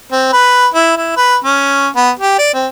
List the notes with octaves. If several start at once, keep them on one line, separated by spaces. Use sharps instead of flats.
C4
B4
E4
E4
B4
C#4
B3
G4
D5
C4